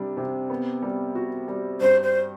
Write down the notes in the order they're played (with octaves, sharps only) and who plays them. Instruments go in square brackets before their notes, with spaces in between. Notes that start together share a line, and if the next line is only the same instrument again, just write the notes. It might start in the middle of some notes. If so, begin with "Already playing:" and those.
Already playing: [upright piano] C3 G3 D4
C3
B3
G3
F#4
G3
[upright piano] G2 [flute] C5
[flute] C5